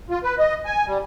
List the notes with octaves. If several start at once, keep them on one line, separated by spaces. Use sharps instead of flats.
F4
B4
D#5
G#5
G3